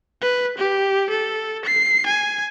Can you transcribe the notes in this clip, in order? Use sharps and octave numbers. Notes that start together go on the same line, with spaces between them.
B4
G4
A4
C7
G#5